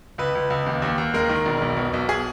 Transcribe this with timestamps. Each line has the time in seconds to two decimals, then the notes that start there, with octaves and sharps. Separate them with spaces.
0.18 C#2 B4
0.35 C#2
0.50 C#2
0.66 D#2
0.82 D#2
0.98 D#2
1.14 G#3 A#4
1.29 D#3
1.46 E1
1.62 B1
1.76 B2
1.94 B1
2.09 G#4